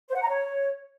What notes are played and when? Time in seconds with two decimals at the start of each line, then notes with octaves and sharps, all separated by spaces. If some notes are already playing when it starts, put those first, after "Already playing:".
0.09 C5
0.15 F#5
0.22 A#5
0.28 C#5